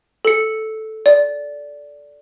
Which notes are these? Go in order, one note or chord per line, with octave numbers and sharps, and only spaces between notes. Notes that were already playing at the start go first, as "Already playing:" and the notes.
A4 C#7
D5